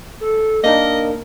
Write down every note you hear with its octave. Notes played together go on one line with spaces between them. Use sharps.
A4
A#3 D4 D#4 A#4 D#5